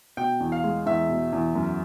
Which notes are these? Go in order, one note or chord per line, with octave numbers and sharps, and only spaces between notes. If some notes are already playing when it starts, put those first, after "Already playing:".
B2 G5
E2
F5
G#3
E2 E5
B2
E2
F#2